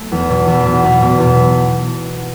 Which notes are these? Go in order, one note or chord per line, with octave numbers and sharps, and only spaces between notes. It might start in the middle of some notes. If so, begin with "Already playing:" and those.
Already playing: A3
E2
B2
E2
B2
E2
B2
E2